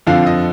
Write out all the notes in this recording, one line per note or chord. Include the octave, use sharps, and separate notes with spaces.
F2 D3 F3 F5
D#5